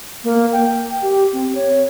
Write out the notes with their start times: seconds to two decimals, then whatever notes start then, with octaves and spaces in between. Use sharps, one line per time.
0.24 A#3
0.53 G5
1.02 G4
1.33 C4
1.55 C#5